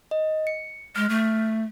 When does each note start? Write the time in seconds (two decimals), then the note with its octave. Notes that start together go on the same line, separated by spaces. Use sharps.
0.11 D#5
0.47 C#7
0.96 G#3 F6
1.09 A3